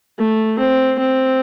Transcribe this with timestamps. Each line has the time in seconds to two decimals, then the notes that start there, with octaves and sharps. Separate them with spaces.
0.19 A3
0.59 C4
0.99 C4